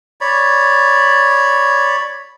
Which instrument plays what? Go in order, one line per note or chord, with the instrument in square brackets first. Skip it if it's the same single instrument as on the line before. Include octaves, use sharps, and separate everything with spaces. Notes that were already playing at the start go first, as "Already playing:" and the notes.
[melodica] C#5 D5 B5